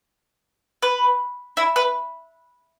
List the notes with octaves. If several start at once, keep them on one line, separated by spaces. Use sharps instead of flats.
B4
E4
B4